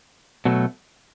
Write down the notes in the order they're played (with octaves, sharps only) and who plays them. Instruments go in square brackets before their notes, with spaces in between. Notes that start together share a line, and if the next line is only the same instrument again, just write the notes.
[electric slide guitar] B2 F#3 A3